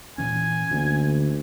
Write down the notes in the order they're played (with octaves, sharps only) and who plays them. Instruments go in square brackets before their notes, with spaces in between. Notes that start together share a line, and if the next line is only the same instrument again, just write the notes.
[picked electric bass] A#2 E3 C#4 [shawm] G#5
[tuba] D2 [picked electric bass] D3 A#3 C#4